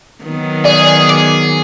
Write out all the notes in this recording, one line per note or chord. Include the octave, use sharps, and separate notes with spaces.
D#3 F#3 B3
G#4 D5
D6